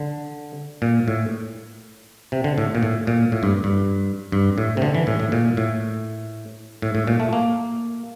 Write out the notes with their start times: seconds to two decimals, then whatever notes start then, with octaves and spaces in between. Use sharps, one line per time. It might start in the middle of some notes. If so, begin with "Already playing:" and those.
Already playing: D3
0.82 A#2
1.08 A2
2.32 C3
2.44 D3
2.58 A2
2.75 A#2
2.83 A2
3.07 A#2
3.32 A2
3.43 G2
3.64 G2
4.32 G2
4.58 A2
4.77 C3
4.82 D3
4.95 E3
5.07 A2
5.20 A2
5.32 A#2
5.57 A2
6.82 A2
6.95 A2
7.07 A#2
7.20 A3
7.33 A#3